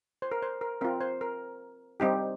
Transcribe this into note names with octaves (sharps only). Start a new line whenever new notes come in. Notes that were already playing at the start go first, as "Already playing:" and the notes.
C5
A#4
C5
A#4
C4 F4 A#4
C5
A#4
G3 C4 D#4 G4